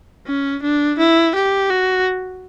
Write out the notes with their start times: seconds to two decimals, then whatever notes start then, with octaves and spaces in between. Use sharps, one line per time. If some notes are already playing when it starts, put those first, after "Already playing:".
0.26 C#4
0.62 D4
0.98 E4
1.35 G4
1.70 F#4